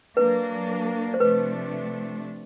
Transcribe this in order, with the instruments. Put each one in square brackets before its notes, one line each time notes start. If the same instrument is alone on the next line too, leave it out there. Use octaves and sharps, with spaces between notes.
[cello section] F#3 A#3 D4 [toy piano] B4
[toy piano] C5
[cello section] C3 F3 A3 D4 [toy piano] B4